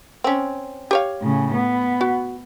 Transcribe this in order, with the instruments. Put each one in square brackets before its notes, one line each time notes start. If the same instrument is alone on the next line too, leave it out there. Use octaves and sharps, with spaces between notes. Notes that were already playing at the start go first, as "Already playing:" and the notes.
[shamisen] C4 C#4
G4 C#5 F5
[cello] A2 C#3
B3
[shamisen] F#4